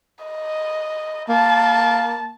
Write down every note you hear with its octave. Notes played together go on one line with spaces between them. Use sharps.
D#5
A#3 A5